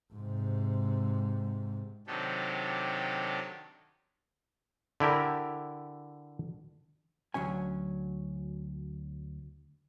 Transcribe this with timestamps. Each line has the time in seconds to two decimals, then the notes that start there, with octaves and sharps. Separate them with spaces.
0.13 G#2 C3
2.07 C3 D#3 F#3 D4 G4 A4
5.00 D3 E4 G4 A#4
7.34 D2 F#3 C#4 G#5